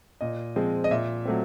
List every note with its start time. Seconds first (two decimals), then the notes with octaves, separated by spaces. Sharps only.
0.21 A#2 D#5
0.56 F3 G#3 C4
0.84 D#5
0.91 A#2 E5
1.25 F#3 A3 C4